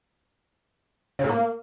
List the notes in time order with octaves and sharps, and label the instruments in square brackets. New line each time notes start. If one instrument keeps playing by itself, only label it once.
[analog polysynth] C#3
A2
A#3